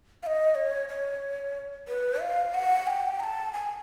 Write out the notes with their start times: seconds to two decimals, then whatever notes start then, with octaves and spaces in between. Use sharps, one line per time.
0.23 F5
0.27 D#5
0.55 C#5
0.89 C#5
1.88 B4
2.20 F5
2.54 F#5
2.87 G#5
2.90 G5
3.20 A#5
3.23 A5
3.53 G#5